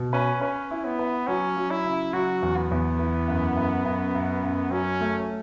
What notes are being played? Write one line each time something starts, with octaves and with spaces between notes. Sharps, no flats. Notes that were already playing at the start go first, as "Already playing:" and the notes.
Already playing: B2
C#4 B4
C#4 B4
E4
B3
B4
F#3 C#4
F#3
E4
C#3
F#3 F#4
E2
B3
E2
E3
F#2
F#2
F#2
F#2
F#2
F#3 C#4
A3